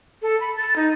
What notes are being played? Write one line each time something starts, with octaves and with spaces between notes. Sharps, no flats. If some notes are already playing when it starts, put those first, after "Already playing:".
A4
B5
A6
D#4